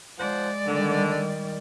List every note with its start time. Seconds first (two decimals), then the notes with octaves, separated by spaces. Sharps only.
0.18 F3 G#3 C5 D5 F#5
0.66 D3 D#3 G3